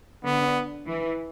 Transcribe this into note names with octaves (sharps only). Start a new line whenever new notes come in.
D3 B3
E3